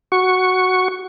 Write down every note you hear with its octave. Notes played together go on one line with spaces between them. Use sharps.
F#4 C#6